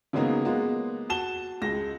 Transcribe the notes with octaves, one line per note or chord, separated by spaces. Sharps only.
C#3 F#3 G#3 A#3 B3 D#4
G#3 A#3 B3
F#4 A5 E7 G7
C#2 G#3 A#6